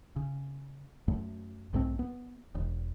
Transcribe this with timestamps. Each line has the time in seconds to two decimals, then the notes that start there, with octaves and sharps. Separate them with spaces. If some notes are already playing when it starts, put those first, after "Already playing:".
0.16 C#3
1.08 F#2 A3
1.73 B1 G#2 A3 C4
1.99 B3
2.55 E1